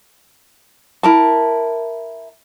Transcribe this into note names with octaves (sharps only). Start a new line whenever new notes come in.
E4 A#4 A5